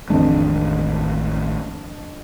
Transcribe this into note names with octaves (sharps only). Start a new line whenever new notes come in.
A1 F2 D#3 G#3 D4